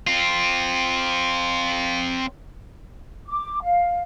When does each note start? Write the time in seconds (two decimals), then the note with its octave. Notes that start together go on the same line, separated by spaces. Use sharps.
0.07 C4 F4
3.28 D6
3.63 F5